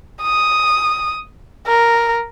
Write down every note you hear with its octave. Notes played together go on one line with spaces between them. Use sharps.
D#6
A#4